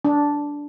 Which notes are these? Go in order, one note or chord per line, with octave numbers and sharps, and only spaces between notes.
D4